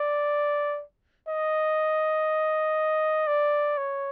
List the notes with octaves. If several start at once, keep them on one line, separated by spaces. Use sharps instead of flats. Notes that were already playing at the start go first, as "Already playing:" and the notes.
Already playing: D5
D#5
D5
C#5